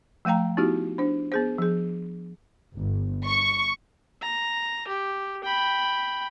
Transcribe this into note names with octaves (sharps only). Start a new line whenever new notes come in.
F3 A3 F5 G5 A#5
B3 D#4 E4 F#4 G4
D4 C5
B3 G#4 C5
F3 G#4
G1
C#6
A#5
G4
G5 B5